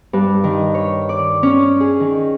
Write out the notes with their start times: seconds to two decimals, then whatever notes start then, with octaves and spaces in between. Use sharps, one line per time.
0.13 G2
0.44 D#3
0.74 C#5
1.09 D5
1.43 C#4
1.80 G#4
2.00 D#3